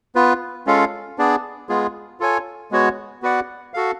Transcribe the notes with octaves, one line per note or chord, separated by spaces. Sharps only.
B3 F4 B4
G#3 C#4 F4 A4 F5
B3 D4 G#4 D5
G#3 B3 F4 G#4
F4 A4 C#5 G#5
G#3 B3 F#4 C#5
B3 F#4 B4 D5 F#5
F#4 A4 F5